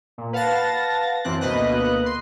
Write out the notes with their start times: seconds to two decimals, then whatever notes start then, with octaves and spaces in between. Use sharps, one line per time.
0.18 A#2
0.33 B4 F5 F#5 A5 A6 A#6
1.24 F#2 E3 C4 F#6
1.41 D2 B2 A#3 B4 D#5 F#6
2.06 C6